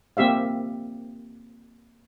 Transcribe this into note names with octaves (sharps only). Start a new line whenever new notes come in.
A#3 C4 G4 E5 F5